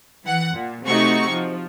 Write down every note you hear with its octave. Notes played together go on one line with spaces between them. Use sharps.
E3 F#5
A#2
C3 A3 D#4 F#4 C#6
F3